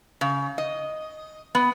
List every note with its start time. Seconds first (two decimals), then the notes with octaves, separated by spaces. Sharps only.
0.21 C#3
0.58 D#5
1.55 B3